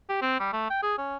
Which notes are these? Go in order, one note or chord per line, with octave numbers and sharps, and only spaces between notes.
G4
C4
G3
A3
G5
G#4
C#4